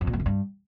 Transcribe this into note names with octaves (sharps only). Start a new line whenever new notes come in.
F2
A#2
F#2
C#3
G2